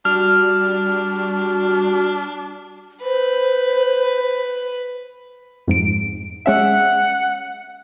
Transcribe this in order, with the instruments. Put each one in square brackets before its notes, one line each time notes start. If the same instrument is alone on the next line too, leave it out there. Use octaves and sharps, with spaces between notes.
[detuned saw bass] G3 [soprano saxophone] D4 [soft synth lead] F#4 [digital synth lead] F6
[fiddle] B4 [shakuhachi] C5
[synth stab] F2 G#2 D7
[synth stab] G#3 C#4 E5 [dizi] F#5